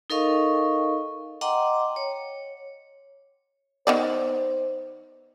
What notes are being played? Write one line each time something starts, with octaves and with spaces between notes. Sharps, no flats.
D#4 A4 A#4 D#5 F5 C#6
D#5 F#5 G5 A#5 C6 D6
C#5
D#3 B3 C5 D5